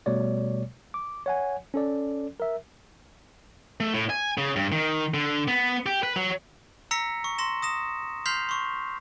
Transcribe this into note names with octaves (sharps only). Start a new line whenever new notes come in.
B2 G3 A3 C#5 D5
D6
C#5 F#5 G#5
C#4 A4 D5
A#4 E5
A3
A2
G#5
C#3
G2
D#3
D3
B3
G4
B4
F#3
A#5 E6 A#6 B6 C#7
C#6
C6 A#6 E7
D#6 A#6 E7
C6 F6 G6 B6 C7 F7
C6 C#6